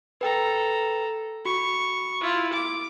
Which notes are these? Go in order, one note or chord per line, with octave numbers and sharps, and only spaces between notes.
A4 B4 G5 A#5
F#4 B5 C#6
E4 F4
D6